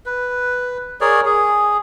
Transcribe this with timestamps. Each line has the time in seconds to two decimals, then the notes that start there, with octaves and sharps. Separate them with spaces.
0.06 B4
1.01 G#4 A#4 C#5 D5
1.25 G#4